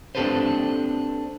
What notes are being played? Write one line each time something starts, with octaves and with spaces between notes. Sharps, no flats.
C4 D4 G4 A4 B4 C5